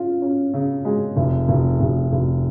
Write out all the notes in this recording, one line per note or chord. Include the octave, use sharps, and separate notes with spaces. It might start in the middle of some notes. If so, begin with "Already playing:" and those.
Already playing: C#4 F4
C#4
C#3
G#3
F1
F1
F1
F1